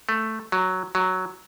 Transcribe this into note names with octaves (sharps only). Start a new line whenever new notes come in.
A3
F#3
F#3